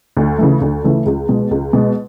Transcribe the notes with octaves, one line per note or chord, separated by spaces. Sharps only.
D2
C#3 E3 A3
D2
C#3 E3 A3
C#2
B2 G#3
C#2
B2 G#3